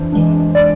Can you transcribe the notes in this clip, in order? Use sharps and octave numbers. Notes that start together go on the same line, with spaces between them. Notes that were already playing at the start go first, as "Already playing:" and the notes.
Already playing: F2 E3 D4 C5
E3 G#3 D4
D5